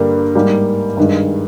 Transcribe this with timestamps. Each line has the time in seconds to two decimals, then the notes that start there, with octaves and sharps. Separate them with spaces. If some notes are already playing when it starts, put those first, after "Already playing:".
Already playing: G2 D3 G3 A#3
0.35 G#2 G3 A#3
0.97 G2 D#3 G#3